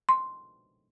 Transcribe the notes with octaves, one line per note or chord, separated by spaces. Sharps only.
C6